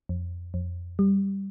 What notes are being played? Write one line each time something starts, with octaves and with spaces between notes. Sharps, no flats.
F2
F2
G3